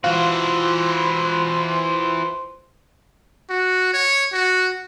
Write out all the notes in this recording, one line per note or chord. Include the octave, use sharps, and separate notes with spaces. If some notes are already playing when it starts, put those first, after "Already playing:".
E3 F4 F#4 C5
F#4
C#5
F#4